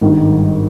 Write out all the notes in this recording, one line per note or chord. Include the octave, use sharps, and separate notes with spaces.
G#1 G2 D#3